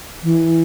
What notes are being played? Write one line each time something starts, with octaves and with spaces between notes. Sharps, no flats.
E3